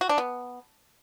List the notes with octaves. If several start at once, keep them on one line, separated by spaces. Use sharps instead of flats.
F#4
D4
B3